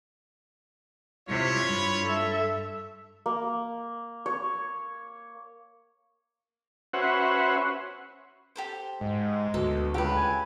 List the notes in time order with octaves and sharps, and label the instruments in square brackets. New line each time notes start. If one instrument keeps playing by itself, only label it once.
[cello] C3 E4 [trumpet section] F4 C#5
[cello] G2 [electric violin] B5
[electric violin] A4 E5
[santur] A#3
C#5
[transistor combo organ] C#4 F#4 B4 C5 E5 F#5
[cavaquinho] G4 A4 C5
[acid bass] G#2 [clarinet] G#3
[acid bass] D2 [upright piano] B2 [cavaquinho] A4
[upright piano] C#2 [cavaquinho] G4 B4
[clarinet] G#5